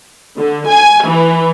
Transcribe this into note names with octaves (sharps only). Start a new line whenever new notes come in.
D3
G#5
E3